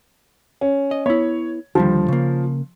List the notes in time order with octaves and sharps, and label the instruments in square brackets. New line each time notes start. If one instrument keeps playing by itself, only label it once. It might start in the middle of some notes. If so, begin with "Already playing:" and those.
[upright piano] C#4
[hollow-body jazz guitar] D#5
[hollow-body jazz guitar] B3 E4 [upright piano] C#5
[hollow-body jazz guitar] D#2 D3 G3 [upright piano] F3
[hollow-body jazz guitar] C#3 A#3